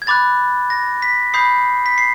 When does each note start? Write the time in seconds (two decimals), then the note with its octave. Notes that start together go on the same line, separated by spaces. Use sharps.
0.02 G#6
0.07 B5 D6 F#6 A6
0.70 A#6
1.02 B6
1.34 B5 D#6 G6 C7
1.86 B6
1.98 C7